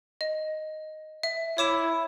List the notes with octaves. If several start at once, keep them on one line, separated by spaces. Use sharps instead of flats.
D#5
E5
E4 C#5 D6 E7